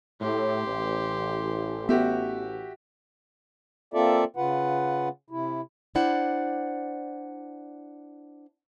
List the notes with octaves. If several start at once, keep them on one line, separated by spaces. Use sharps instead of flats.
A2 G4 C6
A1
B3 F#4 G4 E5
A#3 C4 F4 A4 D5 E5
C#3 F4 B4 F#5
C3 E4
D4 E4 C5 D5 F#5